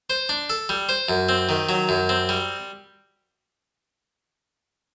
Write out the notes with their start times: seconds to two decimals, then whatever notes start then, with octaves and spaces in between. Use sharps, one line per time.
0.10 C5
0.29 D4
0.50 A4
0.69 G3
0.89 C5
1.09 F#2
1.29 C4
1.49 D#3
1.69 F#3
1.89 F#2
2.09 C4
2.29 G3